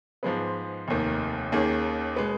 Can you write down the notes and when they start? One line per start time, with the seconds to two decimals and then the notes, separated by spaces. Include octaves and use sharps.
0.23 G#2 F3 G#3 B3
0.88 F1 D#2 D#3
1.52 D#2 D#3 A#3 C#4 G#4
2.16 B2 G#3 B3